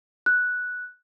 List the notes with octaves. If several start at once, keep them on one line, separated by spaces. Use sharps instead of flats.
F#6